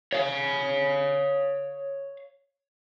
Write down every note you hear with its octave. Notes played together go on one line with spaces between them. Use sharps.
C#5 F5